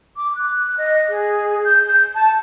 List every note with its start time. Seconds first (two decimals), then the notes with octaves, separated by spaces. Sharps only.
0.17 D6
0.35 F#6
0.78 D#5
1.09 G#4
1.64 G6
1.87 G6
2.14 A5